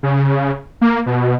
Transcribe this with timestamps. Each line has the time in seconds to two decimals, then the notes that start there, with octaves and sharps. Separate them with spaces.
0.03 C#3
0.81 A#3
1.06 B2